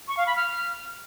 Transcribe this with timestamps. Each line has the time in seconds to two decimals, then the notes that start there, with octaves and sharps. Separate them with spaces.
0.08 C#6
0.17 F5
0.27 B5
0.36 F6